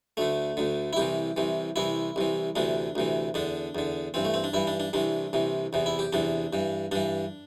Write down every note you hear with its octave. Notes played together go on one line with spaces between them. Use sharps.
D2 D3 A3
D2 D3
E4
C2 C3 E3 G4
C2 C3 E3
C2 C3 E3 E4
C2 C3 E3
D2 C3 E3 D4
D2 C3 E3
E2 D3 D4
E2 D3
G2 E3 C4
A3
C4
D4
G2 E3 E4
D4
D4
C2 C3 E3 D4
C2 C3 E3
E2 C3 E3
E4
G4
E2 C3 E3 D4
G2 E3
G2 E3 D4